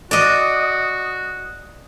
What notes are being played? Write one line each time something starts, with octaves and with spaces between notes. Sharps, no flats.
F#4 D5 D#5